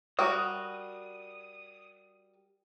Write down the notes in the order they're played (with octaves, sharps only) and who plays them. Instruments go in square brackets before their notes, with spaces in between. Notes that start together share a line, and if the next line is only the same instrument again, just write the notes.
[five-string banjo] G3 F#4 A#4 [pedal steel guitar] D#6